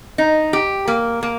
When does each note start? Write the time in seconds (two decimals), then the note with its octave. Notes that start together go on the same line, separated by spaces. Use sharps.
0.18 D#4
0.53 G4
0.88 A#3
1.23 A#3